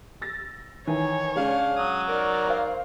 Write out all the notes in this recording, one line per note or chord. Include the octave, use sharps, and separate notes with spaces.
E6 A6 A#6
D#3 E3 C#5 G#5
C#3 G#3 C#4 D4 F5
F#3 D#6
D#4 A#4 D5
C5 F5